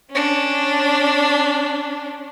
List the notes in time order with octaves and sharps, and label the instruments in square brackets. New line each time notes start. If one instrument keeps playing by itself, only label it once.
[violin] C#4 D4